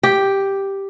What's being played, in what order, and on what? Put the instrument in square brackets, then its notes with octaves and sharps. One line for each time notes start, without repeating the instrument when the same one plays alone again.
[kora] G4